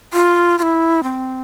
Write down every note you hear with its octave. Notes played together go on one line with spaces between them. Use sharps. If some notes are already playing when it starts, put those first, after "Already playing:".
F4
F4
E4
C4